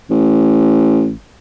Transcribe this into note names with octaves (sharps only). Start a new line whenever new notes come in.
A1